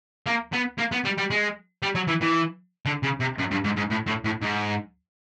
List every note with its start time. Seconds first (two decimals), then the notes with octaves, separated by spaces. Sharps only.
0.26 A#3
0.53 B3
0.78 A#3
0.92 B3
1.05 G3
1.18 G3
1.31 G#3
1.82 G3
1.95 F#3
2.08 E3
2.22 E3
2.86 D3
3.03 C#3
3.20 C3
3.39 F#2
3.51 G2
3.64 G#2
3.77 G#2
3.91 A2
4.07 A2
4.25 A2
4.42 G#2